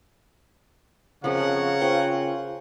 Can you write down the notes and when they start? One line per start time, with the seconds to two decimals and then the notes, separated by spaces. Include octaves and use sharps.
1.24 F2 C#3 F3 A#4 C#5 F#5
1.81 F4 C5 G5